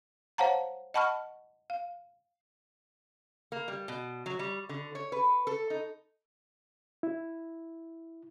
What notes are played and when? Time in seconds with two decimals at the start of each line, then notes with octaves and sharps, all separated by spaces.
0.38 C5 C#5 F5 F#5 A5 A#5
0.94 D#5 F#5 A5 B5 C#6 F6
1.70 F5
3.52 A#3
3.68 G3
3.88 B2
4.26 F#3
4.39 G3
4.69 D3
4.95 C#5
5.12 B4
5.47 A4
5.70 D#4
7.03 E4